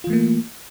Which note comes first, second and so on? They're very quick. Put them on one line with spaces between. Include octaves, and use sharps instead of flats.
F4 E3 A3 A#3